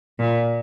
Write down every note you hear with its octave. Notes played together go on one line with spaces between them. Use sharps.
A#2